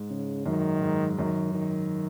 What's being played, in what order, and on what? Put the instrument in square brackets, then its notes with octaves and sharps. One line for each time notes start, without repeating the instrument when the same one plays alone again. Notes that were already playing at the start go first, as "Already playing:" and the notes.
Already playing: [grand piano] G#2
[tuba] C#3
[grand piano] F#2 [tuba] D#3
[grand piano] G#2
[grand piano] F#2 [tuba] D#3
[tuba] D#3